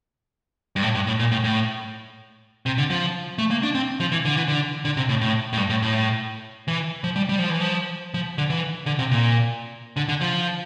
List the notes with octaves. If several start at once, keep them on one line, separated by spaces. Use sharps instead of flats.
G2
A2
G2
A2
A#2
A2
A2
C3
D3
F3
A3
A#3
D4
C4
F3
E3
D3
E3
D3
D3
C3
A2
A2
A2
G2
A2
A2
E3
F3
G3
G3
F3
E3
F3
F3
D3
E3
D3
C3
A#2
D3
D3
F3